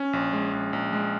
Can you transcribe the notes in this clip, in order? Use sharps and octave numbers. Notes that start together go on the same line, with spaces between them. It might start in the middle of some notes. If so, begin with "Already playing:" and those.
Already playing: C#4
A#1
G#3
A#1
A#1
G#3